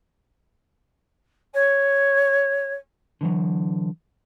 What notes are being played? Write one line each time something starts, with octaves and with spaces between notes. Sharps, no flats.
C#5
D3 E3 F#3